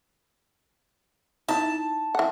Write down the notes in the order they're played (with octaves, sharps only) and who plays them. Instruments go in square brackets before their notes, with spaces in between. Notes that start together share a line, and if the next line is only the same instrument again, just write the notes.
[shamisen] D#4 E4 [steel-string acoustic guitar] A5
[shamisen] E3 F#5